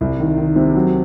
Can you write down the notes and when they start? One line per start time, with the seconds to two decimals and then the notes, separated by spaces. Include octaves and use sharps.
0.01 C2
0.20 D#3
0.38 D#3
0.56 C3
0.75 F#3